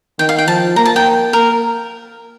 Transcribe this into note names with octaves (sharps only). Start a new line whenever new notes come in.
D#3 G5
F5
G5
F3 A5
A#3 A#5
A5
G5
A#4